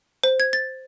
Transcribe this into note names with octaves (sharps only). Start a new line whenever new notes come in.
C5
G#6
A6